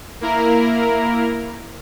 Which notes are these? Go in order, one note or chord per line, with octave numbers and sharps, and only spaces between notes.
A#3 E4 A#4